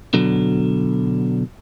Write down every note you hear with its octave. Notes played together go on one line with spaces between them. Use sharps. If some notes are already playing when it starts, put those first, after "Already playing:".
B2 D3 F#3